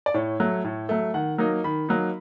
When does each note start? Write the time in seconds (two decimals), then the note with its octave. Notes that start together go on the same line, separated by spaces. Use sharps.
0.06 D5
0.14 A2 C#5
0.40 F#3 A3
0.64 A2
0.89 F#3 A3
1.14 D#3 F#5
1.38 F#3 A#3 D#4
1.64 D#3 B5
1.89 F#3 A#3 D#4